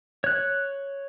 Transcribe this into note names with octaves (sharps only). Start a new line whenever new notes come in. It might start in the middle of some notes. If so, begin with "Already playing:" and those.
C#5 F#6